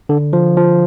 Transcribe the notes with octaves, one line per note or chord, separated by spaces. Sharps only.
D3
F3
F3